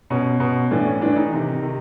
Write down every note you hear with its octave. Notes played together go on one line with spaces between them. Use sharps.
B2 C#4
B2
A2 E3 D4
C#4
A2 E3 D4
D#4
C3 D#3
C3 D#3